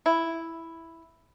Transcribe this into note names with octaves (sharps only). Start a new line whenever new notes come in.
E4